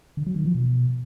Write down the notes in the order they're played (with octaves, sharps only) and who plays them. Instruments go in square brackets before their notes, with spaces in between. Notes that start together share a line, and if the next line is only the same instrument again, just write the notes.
[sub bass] D3
F#3
D#3
F3
B2